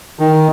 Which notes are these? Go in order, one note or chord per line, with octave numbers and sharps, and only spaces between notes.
D#3